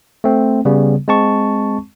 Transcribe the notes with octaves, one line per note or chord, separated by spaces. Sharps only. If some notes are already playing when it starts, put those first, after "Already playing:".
A3 C4
C#3 G3 B3
G#3 C4 A5 C#6